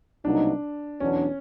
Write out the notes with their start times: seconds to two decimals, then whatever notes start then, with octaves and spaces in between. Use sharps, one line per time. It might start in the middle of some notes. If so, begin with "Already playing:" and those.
0.24 C2 B2 F#3 A#3 D4 D#4
1.00 E2 B2 F#3 B3 C#4 D4